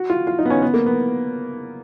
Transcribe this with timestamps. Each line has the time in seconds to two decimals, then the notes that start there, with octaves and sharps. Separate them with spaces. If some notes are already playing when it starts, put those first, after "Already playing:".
Already playing: F#4
0.10 F4
0.27 F4
0.39 D#4
0.45 B3
0.50 C#4
0.62 B3
0.74 A#3
0.86 B3